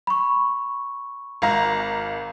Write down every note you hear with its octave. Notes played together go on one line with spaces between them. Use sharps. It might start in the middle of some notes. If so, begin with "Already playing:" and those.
B5 C#6
G#1 F5 A#5